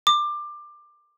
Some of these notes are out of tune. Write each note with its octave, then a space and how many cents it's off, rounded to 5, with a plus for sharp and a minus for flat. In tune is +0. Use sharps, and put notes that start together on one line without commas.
D6 +20